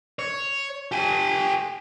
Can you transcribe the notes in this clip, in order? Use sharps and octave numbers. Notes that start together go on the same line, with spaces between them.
C#5
G4 G#5